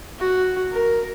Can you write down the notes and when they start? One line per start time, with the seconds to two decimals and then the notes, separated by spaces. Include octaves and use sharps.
0.19 F#4
0.71 A#4